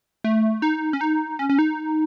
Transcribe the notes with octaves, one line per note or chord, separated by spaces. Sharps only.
A3
D#4
C#4
D#4
C#4
C#4
D#4